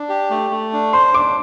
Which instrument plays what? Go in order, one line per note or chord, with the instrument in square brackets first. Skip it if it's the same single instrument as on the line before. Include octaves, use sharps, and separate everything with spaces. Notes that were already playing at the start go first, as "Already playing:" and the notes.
Already playing: [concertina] D4
G4
A3
A3
D4
[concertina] C5 [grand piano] C6
[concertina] D4 [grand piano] D6